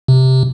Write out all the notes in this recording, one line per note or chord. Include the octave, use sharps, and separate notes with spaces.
C3